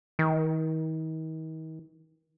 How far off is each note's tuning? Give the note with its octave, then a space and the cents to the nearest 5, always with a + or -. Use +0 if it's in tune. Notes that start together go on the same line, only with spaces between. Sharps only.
D#3 +40